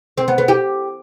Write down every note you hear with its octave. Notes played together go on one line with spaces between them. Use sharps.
C4
B3
B3
G4